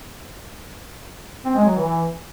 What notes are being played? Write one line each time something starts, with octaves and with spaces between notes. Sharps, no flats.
C4
G#3
F#3
E3